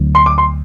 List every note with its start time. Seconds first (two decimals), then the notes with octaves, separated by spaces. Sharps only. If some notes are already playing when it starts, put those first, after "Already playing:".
Already playing: D2 D3 F#3
0.15 C6
0.26 D6
0.38 C6